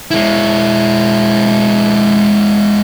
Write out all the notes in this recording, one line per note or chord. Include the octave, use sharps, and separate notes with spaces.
G#3 E4